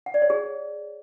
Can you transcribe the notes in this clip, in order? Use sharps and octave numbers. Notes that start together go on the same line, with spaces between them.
F#5
D5
C#5
G#4